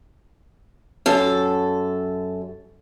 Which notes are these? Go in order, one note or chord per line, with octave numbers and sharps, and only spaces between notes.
F#2 A4